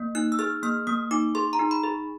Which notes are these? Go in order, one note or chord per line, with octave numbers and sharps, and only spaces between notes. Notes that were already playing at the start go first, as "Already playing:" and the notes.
Already playing: A#3
D#4 F#6
E6
G#4 F6
A#3 F6
A#3 D#6
D#4 D6
G#4 C6
A#5
D#4
B5
G#4